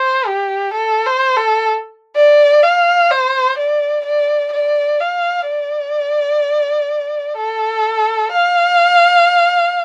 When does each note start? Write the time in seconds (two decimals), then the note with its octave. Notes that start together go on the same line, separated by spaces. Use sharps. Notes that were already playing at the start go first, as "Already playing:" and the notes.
Already playing: C5
0.27 G4
0.74 A4
1.06 C5
1.36 A4
2.16 D5
2.64 F5
3.11 C5
3.58 D5
4.05 D5
4.53 D5
5.00 F5
5.48 D5
7.37 A4
8.32 F5